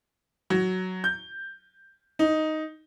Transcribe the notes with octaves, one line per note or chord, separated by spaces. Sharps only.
F#3
G6
D#4